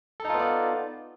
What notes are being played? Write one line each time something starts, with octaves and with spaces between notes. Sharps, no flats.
B3 D#4 F4 A4 D5